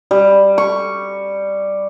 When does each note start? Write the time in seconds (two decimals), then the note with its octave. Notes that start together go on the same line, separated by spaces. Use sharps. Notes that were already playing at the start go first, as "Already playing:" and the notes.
0.11 G3
0.58 C#6